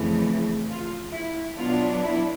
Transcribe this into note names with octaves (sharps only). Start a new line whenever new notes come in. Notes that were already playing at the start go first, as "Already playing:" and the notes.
Already playing: F2 C#3 E3 A3
F4
E4
B2 F#3 B3 D4 F4
E4